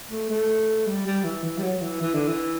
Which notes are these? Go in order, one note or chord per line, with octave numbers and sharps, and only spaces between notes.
A3
A3
G3
G3
E3
E3
G3
F#3
E3
E3
D3
E3